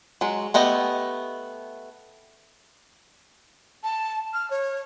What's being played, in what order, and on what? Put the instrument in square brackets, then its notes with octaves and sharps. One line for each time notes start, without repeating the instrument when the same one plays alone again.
[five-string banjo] F#3 G#3
A3 B3 G4 D#5
[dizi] A5
F6
C#5